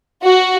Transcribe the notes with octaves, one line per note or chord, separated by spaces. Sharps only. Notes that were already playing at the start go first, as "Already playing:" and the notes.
F#4